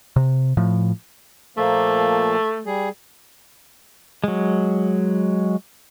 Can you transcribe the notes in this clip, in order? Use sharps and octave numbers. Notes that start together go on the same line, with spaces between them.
C3
A2 F3
A#2 F3 A3 A#3
G3 G#4
F#3 G#3